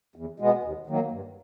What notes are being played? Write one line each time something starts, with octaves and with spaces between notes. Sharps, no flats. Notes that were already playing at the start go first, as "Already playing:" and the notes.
E2
B2 G#3 B3
D#2
D#3 F#3 A#3
G2